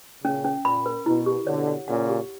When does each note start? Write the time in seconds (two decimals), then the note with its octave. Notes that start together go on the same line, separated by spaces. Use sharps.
0.24 A#2 C#3 C#4
0.45 C#4
0.65 A#2 B5
0.86 A#4
1.06 B2 E4
1.26 G4
1.47 B2 D3 C#5
1.68 F#5
1.88 A#2 C#3 F#5
2.09 G4